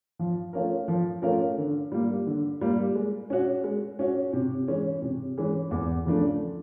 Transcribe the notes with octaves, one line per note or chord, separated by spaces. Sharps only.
F3
A3 C#4 F4 A#4
F3
A3 C#4 F4 A#4
D3
G3 A#3
D3
G3 A#3
G#3
C#4 F#4
G#3
C#4 F#4
C3
E3 G#3 C#4
C3
E3 G#3 C#4
E2
C#3 F3 A3 D4